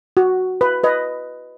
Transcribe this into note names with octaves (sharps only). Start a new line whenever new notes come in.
F#4
B4
B4 D#5